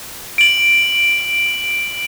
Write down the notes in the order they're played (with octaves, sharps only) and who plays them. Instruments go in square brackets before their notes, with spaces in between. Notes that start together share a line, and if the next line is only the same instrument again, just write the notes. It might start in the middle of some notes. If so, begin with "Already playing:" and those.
[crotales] D7 F#7